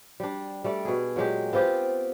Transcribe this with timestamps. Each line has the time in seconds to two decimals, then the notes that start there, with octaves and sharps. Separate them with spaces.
0.20 G3 D4
0.64 G3 A3 D5
0.85 B2 G#4
1.16 A#2 F#3 G#3 G4
1.53 B3 C4 F4 G4